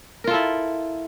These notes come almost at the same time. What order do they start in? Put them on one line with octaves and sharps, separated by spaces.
A#4 F4 A4 E4